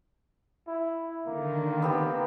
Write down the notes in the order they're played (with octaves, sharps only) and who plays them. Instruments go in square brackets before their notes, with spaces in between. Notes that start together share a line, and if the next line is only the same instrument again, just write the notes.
[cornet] E4
[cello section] D3 D#3 [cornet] A#3
[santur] B3 C4 G4